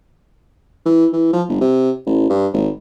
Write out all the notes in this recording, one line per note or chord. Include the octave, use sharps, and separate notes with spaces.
E3
E3
F3
G1
C3
A1
G2
G#1